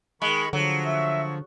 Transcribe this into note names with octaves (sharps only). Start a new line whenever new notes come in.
D#3 G#3 B5 C#6
D3 F3 F#3
E5